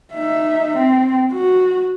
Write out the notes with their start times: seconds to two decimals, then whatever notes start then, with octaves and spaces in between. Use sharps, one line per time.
0.15 D#4 E5
0.77 C4
1.32 F#4